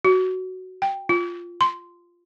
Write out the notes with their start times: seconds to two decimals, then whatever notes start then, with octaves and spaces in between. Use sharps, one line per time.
0.05 F#4
0.82 G5
1.09 F4
1.61 C6